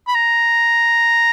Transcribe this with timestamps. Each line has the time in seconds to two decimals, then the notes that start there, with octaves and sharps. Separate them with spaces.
0.08 B5
0.15 A#5